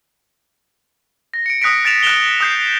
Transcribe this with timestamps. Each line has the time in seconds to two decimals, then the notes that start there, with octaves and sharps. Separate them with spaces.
1.34 A#6
1.46 C#7 D7
1.62 D#6 F#6 A#6 B6 D7
1.84 F#6 A6 D7 E7 F7
2.03 F#6 D7 E7 F7 G7
2.40 D#6 G6 C7